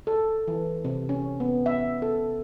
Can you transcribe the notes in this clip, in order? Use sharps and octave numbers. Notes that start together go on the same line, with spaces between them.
A4
E3
C3
C#4
B3
E5
A4